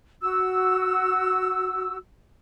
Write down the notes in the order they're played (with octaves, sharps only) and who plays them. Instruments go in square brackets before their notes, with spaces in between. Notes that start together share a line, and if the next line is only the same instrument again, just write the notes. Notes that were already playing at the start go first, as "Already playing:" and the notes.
[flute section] F#4 E6